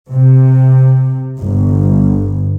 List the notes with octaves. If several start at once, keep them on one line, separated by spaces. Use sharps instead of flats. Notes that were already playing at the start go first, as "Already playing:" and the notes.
C3
G1